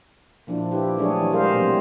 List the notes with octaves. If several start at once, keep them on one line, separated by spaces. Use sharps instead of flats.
A#2 F3 D4 E4
E4 G4 B4
F#3 A3 D4 G#4 C#5
E3 G3
G3 G#3 G#4 A#4 C5 F5
B2 F#3 G3 A3 B3 C4